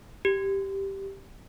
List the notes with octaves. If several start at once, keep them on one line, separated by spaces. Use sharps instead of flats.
G4